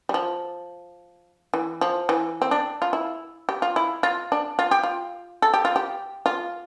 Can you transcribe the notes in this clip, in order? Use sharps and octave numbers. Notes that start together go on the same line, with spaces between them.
G3
F3
E3
F3
E3
C4
D4
F4
E4
G4
F4
E4
F4
D4
F4
G4
F4
A4
G4
F4
G4
F4